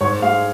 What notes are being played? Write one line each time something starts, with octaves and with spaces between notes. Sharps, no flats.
G#2 C#5
G#3 F5